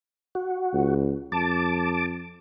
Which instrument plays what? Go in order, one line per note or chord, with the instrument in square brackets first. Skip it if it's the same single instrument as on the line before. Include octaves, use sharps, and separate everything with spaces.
[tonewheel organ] F#4
[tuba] C#2
[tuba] F2 [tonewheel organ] A5 D6